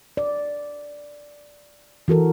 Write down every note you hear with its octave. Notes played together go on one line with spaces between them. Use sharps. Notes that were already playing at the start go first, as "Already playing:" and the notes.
D5
E3 F#4 A4 A#4